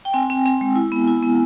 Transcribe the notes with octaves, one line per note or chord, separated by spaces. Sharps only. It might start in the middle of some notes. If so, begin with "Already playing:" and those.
G5
C4 G#5
C4
C4
G#3
E4
B3
E4
B3